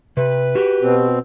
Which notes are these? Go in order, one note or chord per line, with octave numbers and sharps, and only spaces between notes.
C3 B4
F#4 G4
B2 C4